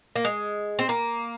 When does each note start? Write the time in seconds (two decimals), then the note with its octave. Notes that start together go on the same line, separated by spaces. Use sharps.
0.16 A#3
0.25 G#3
0.79 C4
0.89 A#3